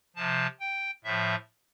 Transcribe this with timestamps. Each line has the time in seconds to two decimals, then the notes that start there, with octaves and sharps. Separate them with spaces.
0.16 C3 F3 A5
0.60 G5
1.04 A2 F3 E5